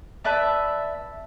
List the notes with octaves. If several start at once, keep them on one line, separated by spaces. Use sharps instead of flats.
B4 D5 E5 A5